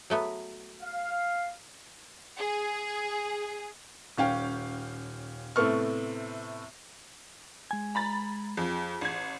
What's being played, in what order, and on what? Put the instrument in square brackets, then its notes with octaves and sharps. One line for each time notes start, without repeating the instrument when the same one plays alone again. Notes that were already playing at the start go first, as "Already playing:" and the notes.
[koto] F#3 A3 B3
[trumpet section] F5
[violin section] G#4
[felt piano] D#1 C#4 F5 G5
A2 C3 A3 B3 C#6 F6
[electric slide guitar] G#3 G#5
[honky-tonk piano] A#5 B5 A6
[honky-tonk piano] F2 [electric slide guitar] G#4
[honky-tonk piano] A1 G#6